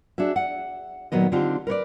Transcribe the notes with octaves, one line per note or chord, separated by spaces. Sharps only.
D4 F#4 G#4 E5
F#5
A#2 D#3 F#3 B3 D#5
D3 C4 D4 D#4 F4 G4
A#4 B4 C#5 D5